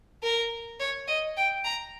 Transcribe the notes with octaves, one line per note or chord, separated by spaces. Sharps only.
A#4
C#5
D#5
G5
A#5